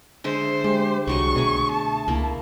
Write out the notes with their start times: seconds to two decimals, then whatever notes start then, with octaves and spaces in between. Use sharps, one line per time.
0.24 D3 G#3 C5 E5
0.64 G#3 G4
1.07 C2 D3 F#3 G#3 C#6
1.36 B2 A3 G#4
1.72 A5
2.08 C#2 A#3 E4